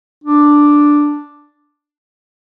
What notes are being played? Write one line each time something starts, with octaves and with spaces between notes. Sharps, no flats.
D4